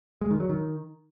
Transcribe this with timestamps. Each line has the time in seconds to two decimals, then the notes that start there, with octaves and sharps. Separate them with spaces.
0.21 G#3
0.31 D#3
0.40 F#3
0.49 D#3